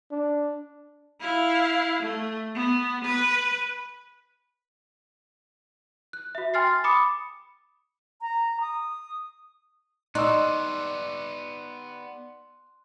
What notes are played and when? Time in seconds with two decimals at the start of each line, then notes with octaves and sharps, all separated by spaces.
0.12 D4
1.21 E4 F5
2.02 A3
2.55 B3
3.04 B4
6.13 F#6
6.35 F#4 E5
6.54 G5 G#5 C6 F6 A6 C7
6.67 A6
6.84 B5 D6 D#6 C#7
8.21 A#5
8.61 D#6
10.15 B3 D#4 G4 D5 C6 C#6 E6 F#6